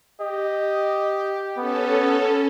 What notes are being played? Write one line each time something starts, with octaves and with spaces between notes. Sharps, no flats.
G4 D#5
B3 C#4 A4